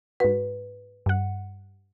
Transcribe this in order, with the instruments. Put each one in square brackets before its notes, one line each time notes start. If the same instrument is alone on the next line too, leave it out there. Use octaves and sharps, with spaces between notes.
[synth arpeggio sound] G#2 F#4 [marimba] B4
[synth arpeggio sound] G2 F#5